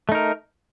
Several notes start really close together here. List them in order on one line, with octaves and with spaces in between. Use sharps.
A3 D#4 A#4